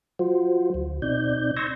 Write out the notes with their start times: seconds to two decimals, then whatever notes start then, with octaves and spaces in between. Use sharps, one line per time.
0.19 F#3 F4 F#4 C5
0.74 D2
1.02 B2 C4 D#4 D5 G6
1.57 C6 C#6 E6 G6 G#6 A#6